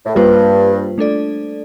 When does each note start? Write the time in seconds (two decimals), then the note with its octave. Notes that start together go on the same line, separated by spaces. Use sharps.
0.06 A2
0.15 G2 G3 A#3 F4 C5
0.98 A3 D4 A4 D5